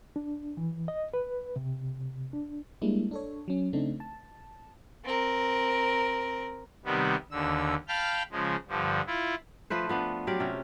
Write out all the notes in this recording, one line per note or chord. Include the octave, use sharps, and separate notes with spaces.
D4
E3
D#5
B4
C3
D4
G3 G#3 A#3 D4 E4
D4 A4 C#5
F#3 C#4
C#3 A3 C4 D4 D#4
A5
C4 A#4
C3 D#3 G3 B3
D#2 D3 E6
F5 G5 A5 B5 F6 G6
C#3 F3 G#3
G2 D3 F3
E4 F4
F3 A3 B4 C5
F3 B3 D4
F#3 F4 G4 D5
C3 C#4